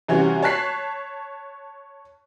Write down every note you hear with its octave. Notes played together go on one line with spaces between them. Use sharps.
C3 E3 G3 C#4 F#4
C#5 A5 F#6 B6 C7